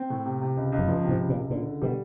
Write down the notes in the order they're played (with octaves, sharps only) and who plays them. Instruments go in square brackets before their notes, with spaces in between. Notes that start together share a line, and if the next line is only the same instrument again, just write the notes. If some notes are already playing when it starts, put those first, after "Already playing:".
Already playing: [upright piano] C4
A2
C3
C3
C#2
C#2
[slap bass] F#2
[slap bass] G2 [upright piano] F3
[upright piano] C3
[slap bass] G#2
[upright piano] C#2
[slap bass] A#2
[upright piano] C#2
[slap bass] A#2 [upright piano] D3
[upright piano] D3
[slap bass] B2 [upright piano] G3